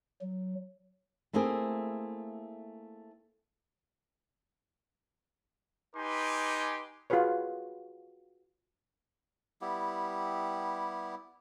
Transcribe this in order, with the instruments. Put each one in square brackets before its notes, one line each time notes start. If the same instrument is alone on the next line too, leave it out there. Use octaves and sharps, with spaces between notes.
[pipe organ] F#3
[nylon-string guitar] A3 A#3 C4 E4 G#4
[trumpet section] D#4 G4 B4 G#5 C6 D6
[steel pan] F4 F#4 G#4 B4 C#5
[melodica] G3 B3 E4 G4